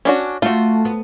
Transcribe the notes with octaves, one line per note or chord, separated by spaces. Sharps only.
C#4 D4 F#4
A3 F4 F#4
B3